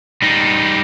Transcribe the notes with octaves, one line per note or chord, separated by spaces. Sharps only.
G3 D#4